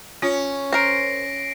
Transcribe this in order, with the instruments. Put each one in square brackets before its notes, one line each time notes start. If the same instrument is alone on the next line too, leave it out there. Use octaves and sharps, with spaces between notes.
[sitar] C#4 [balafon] F4 C#5
[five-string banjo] A#4 C5 [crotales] A#6 C7 D7